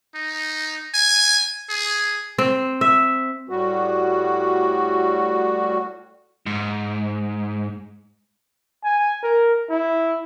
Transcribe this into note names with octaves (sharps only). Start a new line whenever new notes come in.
D#4
G#5
G#4
C4
E5
A2 G3 F#4
G#2
G#5
A#4
E4